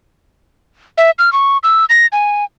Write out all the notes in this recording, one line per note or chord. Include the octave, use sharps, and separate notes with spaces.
E5
F6
C#6
E6
A#6
G#5